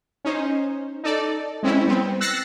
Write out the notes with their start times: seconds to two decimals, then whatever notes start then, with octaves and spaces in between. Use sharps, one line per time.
0.25 C#4 D#4 C5
1.04 D#4 A4 D5
1.63 G#3 C4 C#4 E4
1.86 G3 B3 C4
2.21 E6 F#6 A6 A#6 C7 C#7